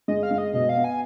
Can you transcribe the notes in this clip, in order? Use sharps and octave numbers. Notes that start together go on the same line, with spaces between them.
G#3 D#5
F5
G#3
D#5
B2 D#5
F5
B3
G#5